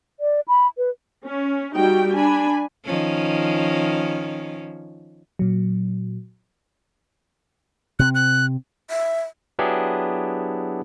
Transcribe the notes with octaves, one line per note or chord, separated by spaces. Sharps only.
D5
B5
B4
C#4
G3 D#4 F#4 G5
D4 G#5 B5
D#3 F3 C#4
A#2 F#3
C3 C4 F#6
F#6
E5
F#3 B3 D4 E4 G4 G#4